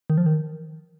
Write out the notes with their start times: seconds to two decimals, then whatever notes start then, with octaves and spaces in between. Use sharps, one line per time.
0.10 D#3
0.18 F3
0.26 D#3